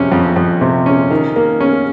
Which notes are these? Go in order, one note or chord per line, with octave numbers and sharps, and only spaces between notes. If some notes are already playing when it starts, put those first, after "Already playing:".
Already playing: F2 C3 C#4
F2
F2
C3
C#4
D#3
A#3
C#4